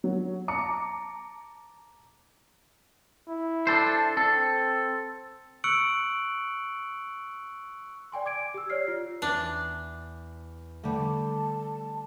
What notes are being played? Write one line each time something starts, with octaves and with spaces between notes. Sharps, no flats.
F#3
A5 A#5 D6 C#7
E4
D4 A4 C5
C4 A4
C#6 E6 F#6 C#7 D7 F#7
D5 G5 G#5 C6
D6 G#6 D7
G4 E6
C#5 D5 F6 C7
F4
E2 D4
D3 G3 A3 A5 D6